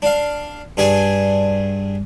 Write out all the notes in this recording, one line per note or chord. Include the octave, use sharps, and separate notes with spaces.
D4 F5
G2 D4 G#4 G#5